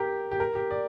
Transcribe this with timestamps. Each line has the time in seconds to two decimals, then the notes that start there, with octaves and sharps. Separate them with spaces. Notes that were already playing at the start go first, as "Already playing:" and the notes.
Already playing: G4 A#4
0.31 G4
0.40 A#4
0.55 G4
0.71 D5